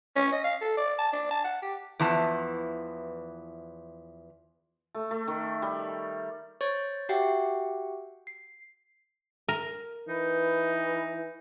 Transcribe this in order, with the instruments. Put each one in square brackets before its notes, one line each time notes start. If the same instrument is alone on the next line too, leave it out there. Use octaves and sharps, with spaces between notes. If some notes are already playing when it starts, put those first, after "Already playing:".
[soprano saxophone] C#4
D#5
F5
A4
D5
A5
D4
A5
F#5
G4
[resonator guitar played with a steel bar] E2 E3 F3 A5
[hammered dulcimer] A3
A3
D#3
G3
[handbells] C5 C#5 C#6 A6
F#4 G4 E5 F#5 G5
C7
[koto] A#4
[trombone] E3 [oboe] D#4 [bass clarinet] B4